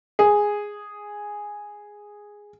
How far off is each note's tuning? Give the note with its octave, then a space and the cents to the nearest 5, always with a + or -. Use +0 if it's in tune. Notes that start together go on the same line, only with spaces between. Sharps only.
G#4 -5